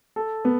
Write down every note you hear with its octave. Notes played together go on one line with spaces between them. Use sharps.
A4
B3